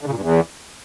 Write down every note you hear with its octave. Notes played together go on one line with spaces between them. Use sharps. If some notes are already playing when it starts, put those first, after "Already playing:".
D3
C#3
A#2
G2
E2